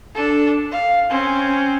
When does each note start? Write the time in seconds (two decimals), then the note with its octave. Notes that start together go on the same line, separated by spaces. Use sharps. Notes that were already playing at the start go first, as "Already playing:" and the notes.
0.15 D4 A4
0.71 F5
1.09 C4 C#4